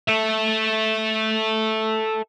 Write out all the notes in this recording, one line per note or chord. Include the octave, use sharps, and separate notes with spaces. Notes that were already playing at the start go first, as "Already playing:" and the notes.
A4 E5